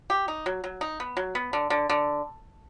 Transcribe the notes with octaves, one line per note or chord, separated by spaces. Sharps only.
G4
D#4
F#3
F#3
D#4
B3
F#3
B3
D3
D3
D3